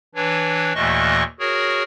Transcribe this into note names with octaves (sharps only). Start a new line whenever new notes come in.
E3 D4 B4 C#5
D#2 A#2 E3 A3 D#5 C#6
F#4 G#4 A#4 C#5